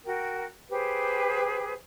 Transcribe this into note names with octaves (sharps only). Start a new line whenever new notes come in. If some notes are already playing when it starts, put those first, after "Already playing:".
F#4 A#4 G5
G4 G#4 B4 C5